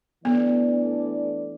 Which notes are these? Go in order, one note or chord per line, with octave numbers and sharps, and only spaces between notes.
E3 A3 B3 D4 A4 D5